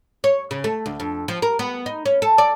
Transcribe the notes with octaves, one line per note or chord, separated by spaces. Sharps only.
C#5
C#3
A3
D2
F2
F3
A#4
B3
D#4
C#4
A4
D5